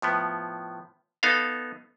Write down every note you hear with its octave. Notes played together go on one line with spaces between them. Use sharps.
A2 F3 B3
B3 D#4 A4 F5